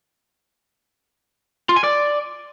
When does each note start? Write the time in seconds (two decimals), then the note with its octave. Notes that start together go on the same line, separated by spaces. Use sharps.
1.69 F4
1.76 G#5
1.83 D5